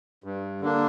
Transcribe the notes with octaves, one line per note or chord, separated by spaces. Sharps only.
G2
D3 A#3 D4